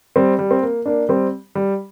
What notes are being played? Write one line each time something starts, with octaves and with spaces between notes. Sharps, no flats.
G3 C4
G3
C4
A#3
A#3 D4
G3 C4
G3